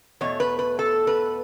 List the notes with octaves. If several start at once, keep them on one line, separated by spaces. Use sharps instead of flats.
E2 B2 A3 C#5
B4
B4
A4
B4